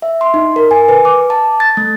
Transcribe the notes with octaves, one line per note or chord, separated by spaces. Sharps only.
E5
C6
D#4
A#4
G#5
B4
D6
A5
A6
A3